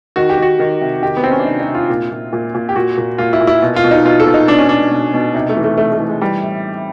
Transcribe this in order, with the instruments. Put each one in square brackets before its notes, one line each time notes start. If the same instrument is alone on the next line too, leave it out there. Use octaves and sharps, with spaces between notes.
[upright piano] D#3 F#4
G4
D#3 F#4
D#3
C3
D#3 G4
B3
D#3 C4
C#4
D4
C3 D#4
D#4
C3
F4
A#2
A#2
A#2
A#2
G4
A#2 F#4
A#2
A#2 F4
E4
A#2
E4
B2
F4
B2
D#4
B2 F4
A4
B2
D#4
B2 D4
C#4
B2 D4
B2
B2
C3 D#4
A3
E3
A3
C3 A3
A3
E3
G#3
E3 G3
A2